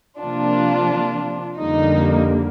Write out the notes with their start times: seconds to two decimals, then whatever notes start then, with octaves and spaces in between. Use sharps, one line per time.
0.20 C3 F3 A#3 D4 F4
1.58 F2 D3 G3 A#3 D#4